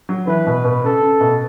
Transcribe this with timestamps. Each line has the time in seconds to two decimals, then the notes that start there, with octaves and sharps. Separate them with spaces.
0.09 F#3
0.27 E3 B4
0.46 B2
0.65 B2
0.84 C#3 A4
1.02 C#3
1.21 B2